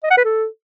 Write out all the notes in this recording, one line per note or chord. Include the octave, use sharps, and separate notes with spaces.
D#5
F#5
B4
A4